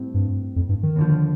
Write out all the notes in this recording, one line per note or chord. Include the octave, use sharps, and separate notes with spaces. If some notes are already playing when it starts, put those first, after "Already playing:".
Already playing: A2 G3 C4
G2
F2
G2
D#3
D#2 D3 F3